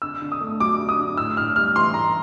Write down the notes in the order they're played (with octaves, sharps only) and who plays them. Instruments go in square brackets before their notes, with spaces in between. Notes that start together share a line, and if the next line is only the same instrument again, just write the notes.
[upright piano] D3 E6
D3
D#6
A3
F#3 D6
D3
D#6
D3
A2 E6
A2 F6
G3 F6
E3 C6
A2 A#5